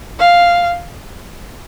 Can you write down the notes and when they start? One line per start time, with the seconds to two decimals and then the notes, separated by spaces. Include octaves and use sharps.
0.19 F5